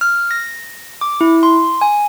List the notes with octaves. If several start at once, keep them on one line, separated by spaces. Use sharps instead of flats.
F6
A#6
D6
E4
C6
G#5